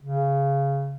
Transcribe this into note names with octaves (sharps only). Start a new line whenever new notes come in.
C#3